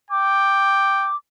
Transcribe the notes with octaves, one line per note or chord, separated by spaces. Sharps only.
G5 D6